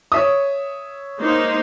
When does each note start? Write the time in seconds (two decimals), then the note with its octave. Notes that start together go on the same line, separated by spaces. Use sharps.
0.12 C#5 E5 D#6
1.21 A#3 D#4 C5